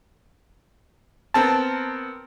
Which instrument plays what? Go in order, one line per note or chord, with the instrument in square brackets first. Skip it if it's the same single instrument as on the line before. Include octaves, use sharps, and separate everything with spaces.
[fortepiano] B3 C4 A#4 [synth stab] A5